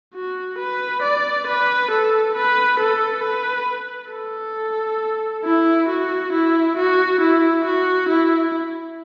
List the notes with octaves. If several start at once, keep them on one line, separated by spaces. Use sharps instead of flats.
F#4
B4
D5
B4
A4
B4
A4
B4
A4
E4
F#4
E4
F#4
E4
F#4
E4